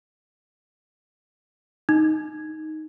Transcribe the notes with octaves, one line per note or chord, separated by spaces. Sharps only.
D#4